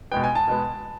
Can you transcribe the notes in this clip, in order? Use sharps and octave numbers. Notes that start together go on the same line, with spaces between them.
B2 G#3 B3 G5
G#5
A5
B2 G#3 B3